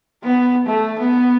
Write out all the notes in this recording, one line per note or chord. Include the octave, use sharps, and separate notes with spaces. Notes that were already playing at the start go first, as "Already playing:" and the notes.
B3
A3
B3